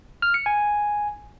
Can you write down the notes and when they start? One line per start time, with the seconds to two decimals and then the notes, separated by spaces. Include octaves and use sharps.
0.22 F6
0.34 C#7
0.46 G#5